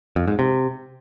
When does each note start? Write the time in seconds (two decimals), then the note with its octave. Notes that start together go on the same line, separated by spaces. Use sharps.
0.16 F2
0.28 G#2
0.39 C3